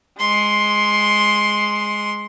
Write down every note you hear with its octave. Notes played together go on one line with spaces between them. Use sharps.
G#3 C6